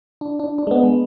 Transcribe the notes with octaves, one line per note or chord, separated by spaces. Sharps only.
D4
D4
D4
G#3
B3
G#3